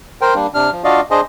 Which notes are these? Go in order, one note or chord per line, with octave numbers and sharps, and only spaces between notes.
A#4 C5 G5
G3 A#3 D4
C3 D4 F6
F3
D4 F4 F#4 D5 D#5 F5
D4 G#4 C5 D#5